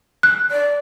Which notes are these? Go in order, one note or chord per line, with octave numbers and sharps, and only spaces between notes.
F#6
D5